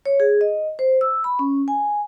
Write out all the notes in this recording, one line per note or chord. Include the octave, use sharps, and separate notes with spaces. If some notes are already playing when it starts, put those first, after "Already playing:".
C#5
G#4
D#5
C5
E6
B5
C#4
G#5